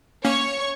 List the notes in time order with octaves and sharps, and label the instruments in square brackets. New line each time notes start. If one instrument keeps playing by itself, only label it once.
[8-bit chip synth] A#3 C#4 [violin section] C#5 C#6